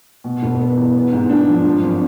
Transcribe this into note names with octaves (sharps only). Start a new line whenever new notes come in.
B2
E1
B3
E2
B3
G#2
D4
F3
F3
G#1